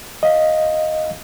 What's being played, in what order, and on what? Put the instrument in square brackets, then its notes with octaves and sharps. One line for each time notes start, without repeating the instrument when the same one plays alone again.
[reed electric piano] D#5 F5